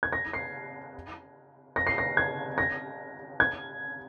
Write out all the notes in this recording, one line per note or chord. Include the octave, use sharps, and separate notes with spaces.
G#6
A#6
C7
A#6
C7
A#6
G#6
A#6
G#6